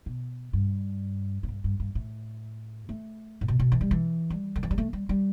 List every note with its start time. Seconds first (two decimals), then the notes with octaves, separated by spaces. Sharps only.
0.06 B2
0.53 G2
1.43 A2
1.49 G2
1.64 G2
1.80 G2
1.95 A2
2.89 A3
3.41 A2
3.48 B2
3.59 B2
3.72 E3
3.81 G3
3.91 E3
4.30 G3
4.56 D3
4.63 E3
4.71 G3
4.78 A3
4.93 G3
5.09 G3